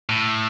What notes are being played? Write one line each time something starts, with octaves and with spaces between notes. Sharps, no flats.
A2